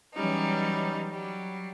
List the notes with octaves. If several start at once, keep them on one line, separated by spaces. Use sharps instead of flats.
E3 F#3 G3 C#4 D#4
F#3 G3